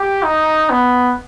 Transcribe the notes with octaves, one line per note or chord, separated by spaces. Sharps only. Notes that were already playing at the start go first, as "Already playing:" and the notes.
Already playing: G4
D#4
B3